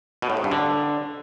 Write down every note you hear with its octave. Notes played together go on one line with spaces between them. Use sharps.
B2
A2
G#2
G2
D3